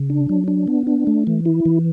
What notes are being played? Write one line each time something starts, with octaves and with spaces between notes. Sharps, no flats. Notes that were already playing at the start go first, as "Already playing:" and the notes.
Already playing: C#3
D4
F#3
D4
B3
D4
A3
E3
E4
E3